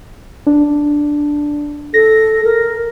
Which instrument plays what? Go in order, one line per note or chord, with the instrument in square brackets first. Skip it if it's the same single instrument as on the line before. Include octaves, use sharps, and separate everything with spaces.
[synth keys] D4
[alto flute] A4 [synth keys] A#6
[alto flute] A#4